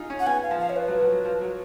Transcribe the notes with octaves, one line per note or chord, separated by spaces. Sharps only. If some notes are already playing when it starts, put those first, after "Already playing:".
Already playing: D#4 F4 G#4
C#4
F#5
B3 G#5
F5
F3
F5
C#5
B4
F#3
F#3
F#3
F3
F#3